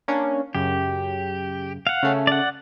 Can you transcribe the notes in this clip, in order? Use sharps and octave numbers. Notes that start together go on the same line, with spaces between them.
A#3 C#4 D4
F#2 C#3 G4
F5 F#5
C#3 A3 C#4
D5 F#5